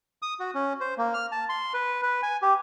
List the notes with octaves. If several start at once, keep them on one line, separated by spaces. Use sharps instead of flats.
D#6
F#4
C#4
C5
A#3
F6
A5
C6
B4
B4
G#5
G4